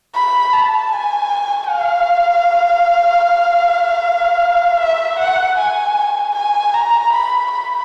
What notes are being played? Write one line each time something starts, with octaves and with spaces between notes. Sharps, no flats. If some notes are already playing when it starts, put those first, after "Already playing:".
B5
A5
G#5
F5
E5
F#5
G#5
G#5
A#5
B5
B5